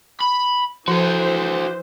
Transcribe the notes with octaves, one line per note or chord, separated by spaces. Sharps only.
B5
E3 F3 F#4 A4 C5